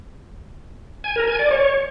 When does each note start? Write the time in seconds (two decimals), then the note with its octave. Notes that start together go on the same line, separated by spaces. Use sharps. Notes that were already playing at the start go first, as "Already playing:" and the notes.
1.04 G#5
1.16 A#4
1.27 G#5
1.39 D5
1.51 C#5